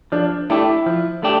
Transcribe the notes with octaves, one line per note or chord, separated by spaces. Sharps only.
F3 D4
A3 D4 E4 G4
F3
A3 D4 G4